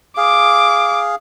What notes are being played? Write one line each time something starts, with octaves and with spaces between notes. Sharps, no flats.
G#4 F5 D6